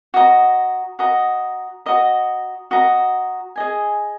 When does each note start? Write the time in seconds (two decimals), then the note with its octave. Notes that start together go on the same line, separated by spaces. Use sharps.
0.14 F#4 D#5 A#5
0.99 F#4 D#5 A#5
1.86 F#4 D#5 A#5
2.71 F#4 D#5 A#5
3.56 G#4 D#5 G#5